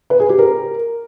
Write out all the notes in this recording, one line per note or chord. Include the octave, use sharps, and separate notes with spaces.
B4
G#4
G4
A#4